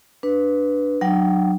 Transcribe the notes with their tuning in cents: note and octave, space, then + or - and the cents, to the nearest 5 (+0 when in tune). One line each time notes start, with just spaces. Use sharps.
D4 +0 B4 +0
F#3 +0 D4 +45 G5 -20